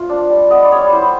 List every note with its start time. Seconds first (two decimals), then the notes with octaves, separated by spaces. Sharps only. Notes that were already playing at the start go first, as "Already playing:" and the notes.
Already playing: F3 A3 F4
0.09 D4
0.30 G3
0.50 B3 D#5
0.65 D5
0.72 G3 C#5
0.92 E4 C5